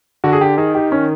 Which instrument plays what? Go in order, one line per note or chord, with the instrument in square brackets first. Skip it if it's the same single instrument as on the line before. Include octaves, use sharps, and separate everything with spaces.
[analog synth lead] D3 [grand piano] F#4
[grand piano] G#4
[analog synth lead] D3 [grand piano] G4
[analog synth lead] D#3 [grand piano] G#4
[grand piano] G4
C#4